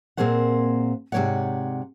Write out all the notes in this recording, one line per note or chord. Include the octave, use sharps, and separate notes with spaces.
A#2 A#3 C4 G#4 C5 F#5
G#2 C3 C4 C#5 D5 F#5